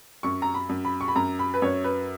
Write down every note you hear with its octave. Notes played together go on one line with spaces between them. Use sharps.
F#2 C#6
A#5
B5
F#2
B5
C#6
B5
F#2 A#5
B5
B4
F#2 C#5
B4